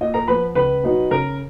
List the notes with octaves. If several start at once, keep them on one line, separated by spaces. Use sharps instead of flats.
A#2 D#5
A#4 A#5
F3 B3 B4 B5
C#2 B4 B5
B2 F#3 B3 D#4
C#3 A#4 A#5